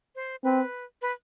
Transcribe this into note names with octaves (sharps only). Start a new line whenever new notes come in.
C5
C4 B4
B4